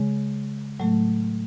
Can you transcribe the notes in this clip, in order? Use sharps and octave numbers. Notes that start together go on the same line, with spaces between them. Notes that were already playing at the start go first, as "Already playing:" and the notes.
Already playing: C#3 G#3 G#4
A2 F#3 A3